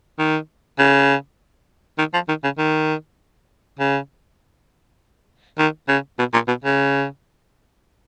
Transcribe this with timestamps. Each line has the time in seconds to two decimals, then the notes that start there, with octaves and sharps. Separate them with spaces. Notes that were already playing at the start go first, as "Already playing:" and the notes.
0.19 D#3
0.79 C#3
1.99 D#3
2.14 F3
2.29 D#3
2.44 C#3
2.58 D#3
3.79 C#3
5.59 D#3
5.88 C#3
6.19 B2
6.34 A#2
6.48 B2
6.64 C#3